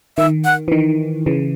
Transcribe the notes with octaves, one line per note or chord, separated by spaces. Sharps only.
D#3 E5
F#5
E3
D#3
C#3 E3